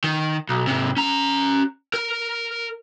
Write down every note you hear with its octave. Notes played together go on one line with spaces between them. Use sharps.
D#3
B1
G#2 C3
C#4 A#5
A#4